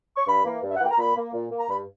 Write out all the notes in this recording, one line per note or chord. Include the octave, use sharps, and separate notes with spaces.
C#6
G2 B5
E3 A#3
G2
E5
F#5
E3 A#3 G5
A#5
A#2 B5
A#3
A#2
A#3
A#5
G2 B5